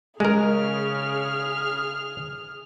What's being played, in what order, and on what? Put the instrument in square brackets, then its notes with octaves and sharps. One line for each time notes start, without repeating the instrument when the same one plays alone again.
[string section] C#3 [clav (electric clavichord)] G#3 A#4 [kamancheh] G#4 F6